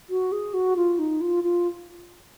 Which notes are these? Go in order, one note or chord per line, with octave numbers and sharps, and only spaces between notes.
F#4
G#4
F#4
F4
D#4
F4
F4